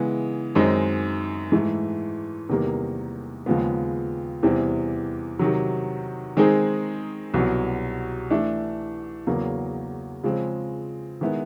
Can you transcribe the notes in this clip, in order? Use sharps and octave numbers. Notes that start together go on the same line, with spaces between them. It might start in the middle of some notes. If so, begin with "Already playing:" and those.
Already playing: C#3 E3 G#3 B3
F#2 D#3 G#3 C4 D#4
G#2 E3 A3
E2 C3 D#3 G3 A#3
D#2 C#3 F3 G#3 B3
E2 C3 E3 G3 C4
C3 D#3 F#3
D#3 G#3 C4 D#4 G#4
C2 B2 F#3
E3 A3 D4
E2 C#3 F#3 A#3
C#3 F3 G#3 C4
D#3 G#3 B3 E4